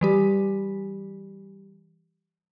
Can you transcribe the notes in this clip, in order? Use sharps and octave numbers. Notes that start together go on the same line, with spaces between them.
E3 G3 G4